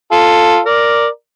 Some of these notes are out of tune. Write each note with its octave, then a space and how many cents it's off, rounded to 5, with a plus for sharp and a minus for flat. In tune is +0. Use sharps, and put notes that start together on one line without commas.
F4 +0 A4 +0
A#4 +0 D5 +0